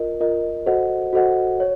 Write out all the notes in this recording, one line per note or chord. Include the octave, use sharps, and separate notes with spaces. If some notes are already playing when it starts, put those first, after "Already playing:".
Already playing: F4 A#4 D#5
F4 A#4 D#5
F#4 A4 C5 D#5 F#5
F#4 A4 C5 D#5 F#5
C#5